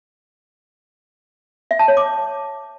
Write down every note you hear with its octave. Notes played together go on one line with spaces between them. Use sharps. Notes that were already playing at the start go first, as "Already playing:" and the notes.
E5
A5
C#5
D6